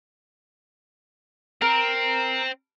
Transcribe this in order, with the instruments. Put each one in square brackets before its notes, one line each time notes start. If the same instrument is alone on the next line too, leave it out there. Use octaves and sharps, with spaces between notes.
[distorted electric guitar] C4 [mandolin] A#4